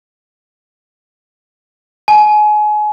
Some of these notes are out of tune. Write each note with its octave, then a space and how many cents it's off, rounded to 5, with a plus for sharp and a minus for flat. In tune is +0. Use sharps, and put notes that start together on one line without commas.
G#5 +30